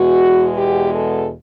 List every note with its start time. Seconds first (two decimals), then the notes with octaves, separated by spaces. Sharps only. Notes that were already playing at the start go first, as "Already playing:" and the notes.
Already playing: E2 B2 G#3 F#4
0.58 G4
0.95 A4